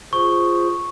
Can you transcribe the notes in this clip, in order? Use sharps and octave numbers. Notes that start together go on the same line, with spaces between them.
F4 G#4 C5 C#6